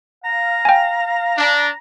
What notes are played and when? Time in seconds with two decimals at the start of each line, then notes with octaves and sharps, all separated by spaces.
0.25 F5 A#5
0.65 G5 G#5
1.38 D4